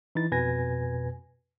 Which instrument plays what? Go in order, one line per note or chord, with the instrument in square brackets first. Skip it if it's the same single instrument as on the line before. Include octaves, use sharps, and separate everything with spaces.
[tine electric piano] E3 D#4 E4 A6
F2 B2 B4 G#5 G#6 A#6